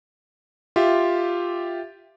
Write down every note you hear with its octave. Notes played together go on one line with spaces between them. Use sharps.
F4 G4 E5